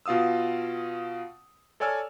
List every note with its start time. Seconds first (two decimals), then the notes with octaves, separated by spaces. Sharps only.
0.06 B2 F4 F5 D#6 E6
1.80 A4 C#5 D5 G#5 E6 F6